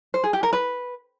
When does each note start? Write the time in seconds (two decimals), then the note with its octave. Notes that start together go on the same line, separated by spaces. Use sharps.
0.14 C5
0.24 G#4
0.33 G4
0.43 A#4
0.53 B4